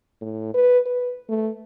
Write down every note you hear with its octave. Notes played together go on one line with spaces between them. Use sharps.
A2
B4
B4
A3